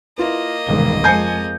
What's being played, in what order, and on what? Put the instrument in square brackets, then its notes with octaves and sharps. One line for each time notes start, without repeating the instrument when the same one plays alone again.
[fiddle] A#3 D#5 [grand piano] E4 F4 B4
[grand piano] E1 G2 G7 [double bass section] C2 D#3 G#3
[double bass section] F2 F3 G#3 [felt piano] G#5 G6 [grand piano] A5 C7 C#7